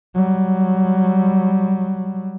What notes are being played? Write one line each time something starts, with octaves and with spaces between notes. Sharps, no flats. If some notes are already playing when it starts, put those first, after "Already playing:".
F#3 G3